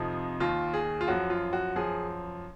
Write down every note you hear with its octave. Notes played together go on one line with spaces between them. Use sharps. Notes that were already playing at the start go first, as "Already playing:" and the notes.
Already playing: F2 C3 F3 D#4
D#2 D#3 F4
G#4
F4
F#2 F3 F#4
F4
F#4
F#2 F3 G#4